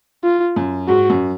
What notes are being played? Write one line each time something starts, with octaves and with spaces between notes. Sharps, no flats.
F4
F#2
G#2 F#4
F#2